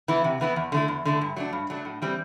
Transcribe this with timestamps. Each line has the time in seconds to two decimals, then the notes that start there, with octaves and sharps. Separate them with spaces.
0.08 E3 B3 E4
0.24 C3
0.41 E3 B3 E4
0.56 E2
0.72 D3 A3 E4
0.88 E2
1.05 D3 A3 E4
1.21 G2
1.36 F#3 A3 D4
1.53 G2
1.70 F#3 A3 D4
1.85 A2
2.02 E3 G3 C4